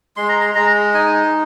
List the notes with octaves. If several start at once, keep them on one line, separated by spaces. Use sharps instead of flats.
G#3 C6
A#5
C6
G#3 A#5
D#4 G#5